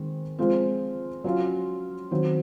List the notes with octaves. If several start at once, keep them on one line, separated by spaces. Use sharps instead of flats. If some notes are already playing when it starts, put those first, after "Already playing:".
Already playing: D#3 G#3 C4
F3 G#3 C4 F4
F#3 C#4 F4
D#3 F#3 C4